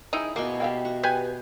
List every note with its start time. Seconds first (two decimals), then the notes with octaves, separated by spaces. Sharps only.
0.13 D#4 E4 G#4
0.36 B2 A#3 G#5 C#6
0.60 F#4 G4 E5 F5 G5
0.85 F#4 C#6
1.03 G4 B4 G#5